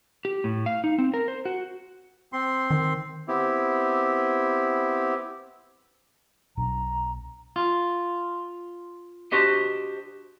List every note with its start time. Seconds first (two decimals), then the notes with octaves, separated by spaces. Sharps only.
0.25 G4
0.44 A2
0.66 F5
0.84 D#4
0.98 C4
1.14 A#4
1.28 C5
1.45 F#4
2.33 C4 C6
2.70 D#3
3.28 B3 C4 E4 G4
6.57 B1 B2 D4 A#5
7.56 F4
9.32 D4 F#4 G4 C5 D#5